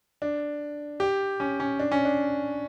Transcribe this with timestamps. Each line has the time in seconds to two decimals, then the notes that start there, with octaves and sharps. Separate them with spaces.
0.22 D4
1.00 G4
1.40 C#4
1.60 C#4
1.79 D4
1.92 C#4
2.05 D4